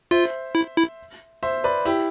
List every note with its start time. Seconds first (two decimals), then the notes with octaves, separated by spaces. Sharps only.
0.11 F4 C5 E5
0.55 E4
0.77 E4
1.43 C5 E5
1.64 B4 D5
1.85 E4 G4